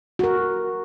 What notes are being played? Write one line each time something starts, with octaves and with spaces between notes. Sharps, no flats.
F#4 A#4